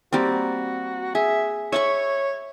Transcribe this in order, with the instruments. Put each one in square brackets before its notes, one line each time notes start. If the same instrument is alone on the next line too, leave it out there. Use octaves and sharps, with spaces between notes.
[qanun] G3 A#3 C4 [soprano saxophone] F#4
[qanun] G#4 [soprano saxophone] E5
[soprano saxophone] C#5 [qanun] E5 B5 C#6